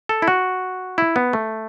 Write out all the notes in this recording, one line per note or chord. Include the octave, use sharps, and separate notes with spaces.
A4
E4
F#4
E4
B3
A3